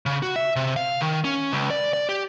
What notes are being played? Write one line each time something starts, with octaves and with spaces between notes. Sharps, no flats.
C#3
F#4
E5
C3
F5
D#3
C#4
C#2
D5
D5
G4